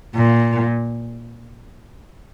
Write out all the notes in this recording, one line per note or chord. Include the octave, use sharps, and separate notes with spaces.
A#2